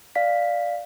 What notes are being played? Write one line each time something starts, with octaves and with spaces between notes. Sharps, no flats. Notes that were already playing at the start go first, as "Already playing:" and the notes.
D5 F5 B6